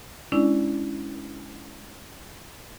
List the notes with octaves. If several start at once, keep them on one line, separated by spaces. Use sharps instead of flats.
G#3 C#4 D4 E4 D5